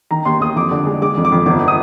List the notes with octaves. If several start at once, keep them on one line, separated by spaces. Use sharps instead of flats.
D#3 A#5
D#2 C6
D#2 D#6
F2 D6
D3
G#3
G#3 D6
F2
D6
F2
G1 D6
D#6